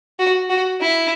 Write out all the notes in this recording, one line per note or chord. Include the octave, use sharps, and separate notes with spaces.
F#4
F#4
E4